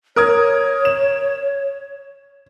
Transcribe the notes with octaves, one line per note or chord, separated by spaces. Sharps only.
A#4 C#5 D#6 G#6
E7